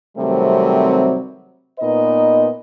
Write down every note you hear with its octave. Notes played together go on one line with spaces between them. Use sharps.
C3 D#3 F#3 G3 A3 C4
A#2 B3 D#4 B4 D#5